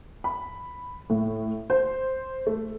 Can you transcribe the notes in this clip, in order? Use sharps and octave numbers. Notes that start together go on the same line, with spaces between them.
B5
A2
C5
A3